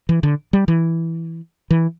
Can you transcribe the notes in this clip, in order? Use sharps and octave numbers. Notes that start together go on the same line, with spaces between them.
E3
D3
G3
E3
E3